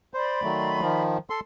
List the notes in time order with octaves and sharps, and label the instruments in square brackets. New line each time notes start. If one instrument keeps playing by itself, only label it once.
[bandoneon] C5 [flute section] D5 B5 C6
[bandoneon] D#3 F#3 A3
D#3 F3
A4 C6